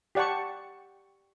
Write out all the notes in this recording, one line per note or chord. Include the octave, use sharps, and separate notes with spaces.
G4 D5 F#5 A5 C#6